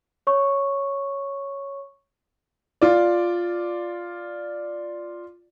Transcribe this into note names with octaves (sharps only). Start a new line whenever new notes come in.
C#5 C#6
F4 D5